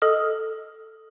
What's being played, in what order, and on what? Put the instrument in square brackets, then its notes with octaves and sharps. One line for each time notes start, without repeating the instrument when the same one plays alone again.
[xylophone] A4 D#5 D#6 F6